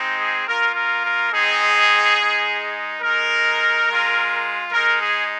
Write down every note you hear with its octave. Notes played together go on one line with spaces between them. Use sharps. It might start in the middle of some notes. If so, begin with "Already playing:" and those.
Already playing: G#3 C4 D#4
G#4
A#3 F4 A#4
A#4
A#4
G#3 C4 D#4 G#4
G#3 D#4
G#3 D#4 A#4
G#3 F4
G#3 D#4 A#4
G#4